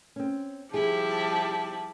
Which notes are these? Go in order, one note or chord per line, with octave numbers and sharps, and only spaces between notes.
C4 C#4
F3 G3 E4 G4 G#4 A5